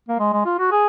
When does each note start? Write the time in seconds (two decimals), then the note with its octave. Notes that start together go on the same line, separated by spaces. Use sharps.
0.08 A#3
0.19 G#3
0.33 G#3
0.46 F4
0.59 F#4
0.71 G#4